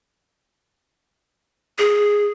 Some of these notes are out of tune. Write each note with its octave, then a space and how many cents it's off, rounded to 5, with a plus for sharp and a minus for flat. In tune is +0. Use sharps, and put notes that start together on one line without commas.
G#4 -5